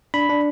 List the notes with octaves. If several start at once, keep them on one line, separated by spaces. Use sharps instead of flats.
D4 B5
D4